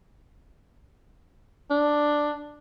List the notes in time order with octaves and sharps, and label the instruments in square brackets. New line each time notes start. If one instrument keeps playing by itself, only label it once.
[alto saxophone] D4